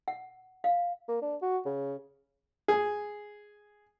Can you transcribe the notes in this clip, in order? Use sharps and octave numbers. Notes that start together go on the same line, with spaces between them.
F#5
F5
A#3
D4
F#4
C#3
G#4